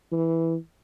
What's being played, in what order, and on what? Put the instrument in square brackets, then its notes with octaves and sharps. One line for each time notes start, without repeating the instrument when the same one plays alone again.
[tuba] E3